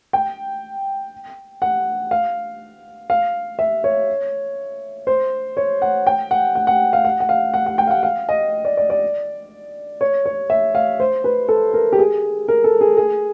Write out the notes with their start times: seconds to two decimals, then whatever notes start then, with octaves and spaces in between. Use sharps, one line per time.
0.13 G5
1.62 F#5
2.11 F5
3.10 F5
3.59 E5
3.84 C#5
5.07 C5
5.57 C#5
5.82 F#5
6.07 G5
6.31 F#5
6.55 F#5
6.67 F#5
6.93 F5
7.05 F#5
7.20 F#5
7.29 F5
7.54 F#5
7.66 F#5
7.78 G5
7.87 F5
7.91 F#5
8.03 F5
8.29 D#5
8.65 D5
8.77 D5
8.90 D5
10.01 C#5
10.26 C#5
10.50 E5
10.75 F5
11.00 C5
11.24 B4
11.49 A4
11.74 A#4
11.92 G4
11.99 G#4
12.48 A#4
12.64 A4
12.81 G#4
12.97 G#4